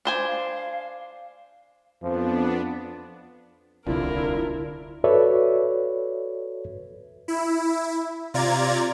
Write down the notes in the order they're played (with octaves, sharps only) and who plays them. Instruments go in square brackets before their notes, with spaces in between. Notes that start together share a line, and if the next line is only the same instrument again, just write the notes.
[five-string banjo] D4 C5 G#5
[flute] F5
[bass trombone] F2 [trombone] F3 [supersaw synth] B3 D4
[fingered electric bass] D1 C2 D3 [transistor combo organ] D4 F4 [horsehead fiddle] E4 [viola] A#4
[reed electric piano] F#4 A4 B4 C#5 D5 E5
[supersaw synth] E4
C3 F4 D5 A#5 G#6 A6